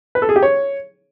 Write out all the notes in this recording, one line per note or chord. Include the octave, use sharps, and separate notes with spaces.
B4
A4
G#4
G4
C#5